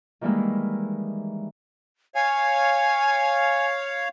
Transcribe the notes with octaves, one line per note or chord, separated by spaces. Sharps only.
D#3 E3 G3 G#3 A#3 E4
C#5 F5 G#5